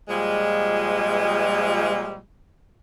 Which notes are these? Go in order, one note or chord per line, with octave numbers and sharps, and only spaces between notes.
A#2 F3 G3 G#3